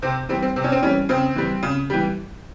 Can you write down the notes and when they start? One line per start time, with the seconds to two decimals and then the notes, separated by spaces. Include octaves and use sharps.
0.02 C3 C4
0.29 E3 G3 C4
0.42 C4
0.56 C3 C4
0.64 C#4
0.72 C4
0.83 E3 G3 C#4
1.09 C#3 C4
1.35 E3 G3
1.63 C#3
1.90 E3 G3